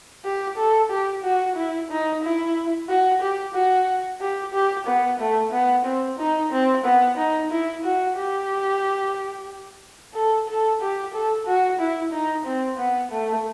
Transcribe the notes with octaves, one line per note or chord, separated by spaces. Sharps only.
G4
A4
G4
F#4
E4
D#4
E4
F#4
G4
F#4
G4
G4
B3
A3
B3
C4
D#4
C4
B3
D#4
E4
F#4
G4
A4
A4
G4
A4
F#4
E4
D#4
C4
B3
A3